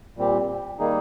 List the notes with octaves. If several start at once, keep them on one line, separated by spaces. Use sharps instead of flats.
A#2 G3 C4 G4
D#3 G3 A#3 D#4 G#4